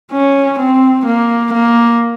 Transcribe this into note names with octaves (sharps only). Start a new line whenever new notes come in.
C#4
C4
A#3
A#3